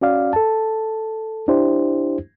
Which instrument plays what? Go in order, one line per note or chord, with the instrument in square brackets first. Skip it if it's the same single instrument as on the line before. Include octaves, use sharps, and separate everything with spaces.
[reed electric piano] C#4 F#4 D5 F5
A4 A5
D4 E4 G4 C5